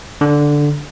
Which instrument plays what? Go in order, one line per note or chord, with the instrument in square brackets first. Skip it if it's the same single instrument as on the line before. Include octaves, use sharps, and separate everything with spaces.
[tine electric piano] D3